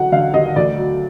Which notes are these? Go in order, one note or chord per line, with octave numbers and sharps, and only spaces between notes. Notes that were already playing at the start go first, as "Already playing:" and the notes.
Already playing: D3 F#3 F#5
D3 F5
D#2 D#5
D2 D5
F#3